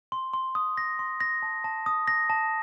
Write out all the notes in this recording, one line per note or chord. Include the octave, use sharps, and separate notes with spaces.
C6
C6
D#6
A#6
C6
A#6
A5
A5
D#6
A#6
A5